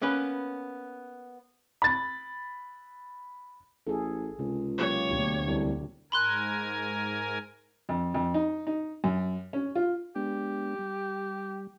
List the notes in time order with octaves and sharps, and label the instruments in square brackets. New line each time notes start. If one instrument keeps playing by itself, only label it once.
[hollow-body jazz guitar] A#3 B3 C#4 B4
[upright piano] B5 A6
[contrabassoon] A1 [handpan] G#4 A4
[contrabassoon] C#2 [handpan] C3
[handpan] F#3 A#3 G4 [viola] C#5
[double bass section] D2 [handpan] B2 D4 G4
[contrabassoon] C2
[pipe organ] G#2 A#4 G#5 [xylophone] B5 C6 F#6
[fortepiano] F2
F2
D#4
D#4
F#2
C#4
F4
[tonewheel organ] G#3 B3 D4 [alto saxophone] G4
[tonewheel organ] G3